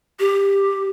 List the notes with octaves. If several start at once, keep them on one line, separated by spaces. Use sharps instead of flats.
G4